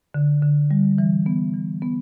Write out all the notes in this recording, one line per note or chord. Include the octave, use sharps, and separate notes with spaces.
D3
D3
G3
E3
B3
E3
B3